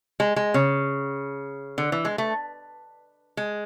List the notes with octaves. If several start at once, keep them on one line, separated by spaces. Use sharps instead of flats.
G#3
G#3
C#3
D3
E3
G#3
A3
G#3